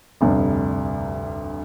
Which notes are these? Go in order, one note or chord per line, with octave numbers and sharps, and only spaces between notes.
F1 D2 G2 C3